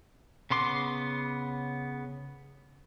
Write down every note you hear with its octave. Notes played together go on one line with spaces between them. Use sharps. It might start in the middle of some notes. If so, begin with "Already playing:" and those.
C#3 B3 C6 D6